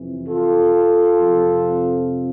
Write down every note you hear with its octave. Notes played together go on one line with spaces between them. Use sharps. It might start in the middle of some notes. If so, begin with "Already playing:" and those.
Already playing: F2 C3 E3
F4 A4
F2 C3 F3